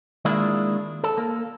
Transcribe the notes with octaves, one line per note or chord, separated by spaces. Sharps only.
D#3 G#3 A#3 D4 E4 F4
A4
A#3